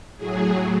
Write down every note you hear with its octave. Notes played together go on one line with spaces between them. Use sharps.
A2 F#3 G#4